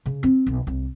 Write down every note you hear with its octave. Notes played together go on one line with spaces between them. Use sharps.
C#3
C4
B1
C2